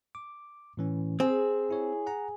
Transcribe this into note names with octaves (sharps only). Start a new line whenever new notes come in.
D6
A2 E3 C#4
C4 G#4 C6
E4 C#5
F#5 A#5